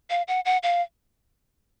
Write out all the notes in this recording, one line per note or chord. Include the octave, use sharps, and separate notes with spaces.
F5
F#5
F#5
F5